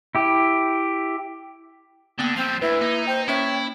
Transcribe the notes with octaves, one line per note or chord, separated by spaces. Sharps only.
E4 G4
D3 A#3 B3 G5
F3 G3 C4 C7 E7
D2 E4 B4
A#3 D#4
C5 G5
A#3 C#4 E4 C#5 E5 G5